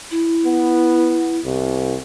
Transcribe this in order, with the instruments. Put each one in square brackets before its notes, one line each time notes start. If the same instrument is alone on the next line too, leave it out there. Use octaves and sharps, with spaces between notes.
[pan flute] E4
[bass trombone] B3
C2